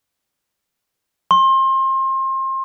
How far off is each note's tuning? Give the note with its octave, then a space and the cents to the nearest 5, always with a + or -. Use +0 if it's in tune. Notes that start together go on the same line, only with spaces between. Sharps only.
C6 +30